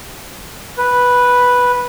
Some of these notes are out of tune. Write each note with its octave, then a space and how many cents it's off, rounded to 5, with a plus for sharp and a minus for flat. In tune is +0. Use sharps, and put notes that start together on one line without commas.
B4 -5